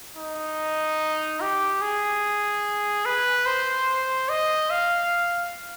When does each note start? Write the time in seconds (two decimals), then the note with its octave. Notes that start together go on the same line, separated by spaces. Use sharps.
0.17 D#4
1.41 G4
1.81 G#4
3.05 B4
3.46 C5
4.29 D#5
4.70 F5